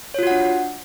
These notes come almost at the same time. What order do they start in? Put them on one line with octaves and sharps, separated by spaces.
C#5 F4 F#4 F#5 D4